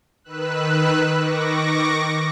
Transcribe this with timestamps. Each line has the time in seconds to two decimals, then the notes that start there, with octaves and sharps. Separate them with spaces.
0.24 D#3 B4 E6 F#6
1.17 D#3 C#6 D6 A#6